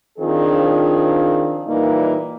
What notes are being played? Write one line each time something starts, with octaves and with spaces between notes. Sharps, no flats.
D#3 F3 C4 D4 F4 G#4
A#2 E3 G3 A#3 D#4